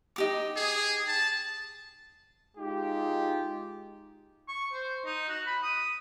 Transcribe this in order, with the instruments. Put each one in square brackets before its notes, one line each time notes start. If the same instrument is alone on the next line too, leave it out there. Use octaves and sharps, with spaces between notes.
[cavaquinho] D#4 G4 D6
[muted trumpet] G#4
A5
[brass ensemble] G#3 D#4 F4 G4
[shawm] C#6
C5
D#4
F#4
B5
D#6